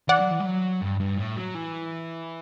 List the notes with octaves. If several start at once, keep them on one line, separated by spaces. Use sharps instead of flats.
E3 D5 F#5
F#3
E3
G3
F#3
G2
G2
A2
F#3
E3